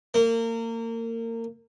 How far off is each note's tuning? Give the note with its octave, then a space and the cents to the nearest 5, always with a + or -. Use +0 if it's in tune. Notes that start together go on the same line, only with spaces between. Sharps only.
A#3 -30